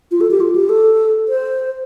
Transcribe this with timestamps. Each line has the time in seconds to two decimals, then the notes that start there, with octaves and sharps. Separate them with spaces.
0.11 F4
0.21 A4
0.31 G4
0.40 F4
0.56 G4
0.69 A4
1.29 C5